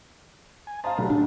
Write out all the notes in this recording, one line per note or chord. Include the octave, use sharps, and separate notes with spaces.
G#5
C5 D#5 F5 A5 A#5
B1 F#3 G3 A4 B4
A2 D4